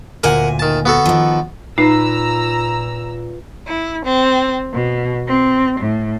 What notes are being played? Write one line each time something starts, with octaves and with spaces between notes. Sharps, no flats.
D2 A#2 A#4 F#5 G#5
D#3 A5
B3 F#4 A4
D#3 F3
A#2 D#4 F4 B4 A#5 E6
E4
C4
B2
C4
A2